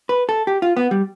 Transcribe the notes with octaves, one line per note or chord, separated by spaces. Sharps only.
B4
A4
G4
F4
B3
G3